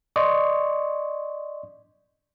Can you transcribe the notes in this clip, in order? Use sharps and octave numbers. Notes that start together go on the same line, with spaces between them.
D5 D#5 C6 C#6